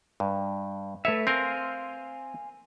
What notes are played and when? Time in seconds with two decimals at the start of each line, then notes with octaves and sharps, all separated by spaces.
0.20 G2
1.05 A3 B4 C#5 E5
1.27 C4 A#4 F5 G#5 C6